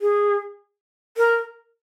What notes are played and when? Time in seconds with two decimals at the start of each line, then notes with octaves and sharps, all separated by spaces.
0.01 G#4
1.17 A#4